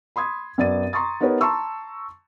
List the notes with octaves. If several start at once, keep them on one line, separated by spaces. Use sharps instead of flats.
B5 C6 D#6 G#6
F#2 B3 D5 A6 D#7
A#5 C6 C#6 D#6 A6
B3 D#4 G4 A#4 B4 C#5
A5 A#5 C6 C#6 E6